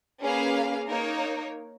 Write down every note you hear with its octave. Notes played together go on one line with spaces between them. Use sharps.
A#3 C#4 G#4 B4 F5
A#3 D#4 A#4 C#5